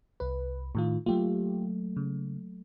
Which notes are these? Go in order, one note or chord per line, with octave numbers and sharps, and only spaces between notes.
C2 B4
A2 D#3 F4
F#3 A3 A#3 F4 G4
C#3